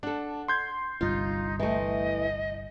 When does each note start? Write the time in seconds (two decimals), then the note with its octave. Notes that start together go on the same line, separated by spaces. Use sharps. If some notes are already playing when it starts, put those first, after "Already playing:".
0.03 D4 A4 F#5
0.48 C6 G6 G#6
1.01 G1 C2 G2 D#4 F4
1.60 E3 A3 D#5